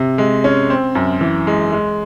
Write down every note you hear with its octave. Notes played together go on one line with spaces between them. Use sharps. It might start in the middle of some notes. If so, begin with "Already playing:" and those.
Already playing: C3
G#3
C#4
C4
F#2
E3
G#3
G#3